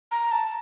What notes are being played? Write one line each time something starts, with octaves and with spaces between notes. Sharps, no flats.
A#5
A5